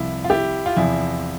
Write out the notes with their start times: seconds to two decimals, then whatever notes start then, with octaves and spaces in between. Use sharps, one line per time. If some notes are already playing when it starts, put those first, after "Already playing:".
Already playing: C2 C3 F3 E4
0.24 F4
0.30 E4 G4
0.66 F4
0.77 E2 C3 F3 E4